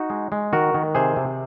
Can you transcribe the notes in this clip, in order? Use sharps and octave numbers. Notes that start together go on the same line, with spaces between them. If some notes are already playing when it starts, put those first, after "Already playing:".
Already playing: D#4 F#4
G#3
G#3
D#3 F#4 A#4
D#3
C3 G#4 C5
C3